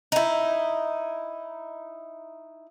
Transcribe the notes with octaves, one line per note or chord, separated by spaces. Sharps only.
D#4 E4